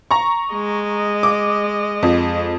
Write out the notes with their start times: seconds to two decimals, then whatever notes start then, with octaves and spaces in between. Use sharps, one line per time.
0.11 A#5 C#6
0.53 G#3 D#5
1.23 D6
2.03 F2